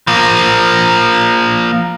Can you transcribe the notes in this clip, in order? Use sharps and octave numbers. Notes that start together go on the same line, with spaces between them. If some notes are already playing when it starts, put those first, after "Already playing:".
F3 A#3